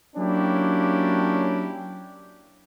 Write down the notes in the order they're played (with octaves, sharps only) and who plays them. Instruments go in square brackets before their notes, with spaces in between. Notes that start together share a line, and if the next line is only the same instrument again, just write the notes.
[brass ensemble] F#3 A#3 C#4 D4 E4 G4